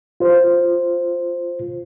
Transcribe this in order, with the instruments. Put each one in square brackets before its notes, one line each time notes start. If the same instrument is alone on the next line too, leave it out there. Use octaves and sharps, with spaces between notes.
[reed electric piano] F4 C5